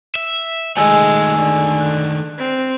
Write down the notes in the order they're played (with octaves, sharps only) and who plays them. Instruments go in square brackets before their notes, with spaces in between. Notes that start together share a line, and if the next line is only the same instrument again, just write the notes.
[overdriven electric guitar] E5
[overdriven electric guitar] D#3 A3 [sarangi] G#3 [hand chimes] G#5 E6
[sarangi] D3
[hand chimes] F#6
[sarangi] C4